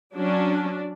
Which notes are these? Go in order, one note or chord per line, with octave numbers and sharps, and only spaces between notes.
F#3 C#4 D4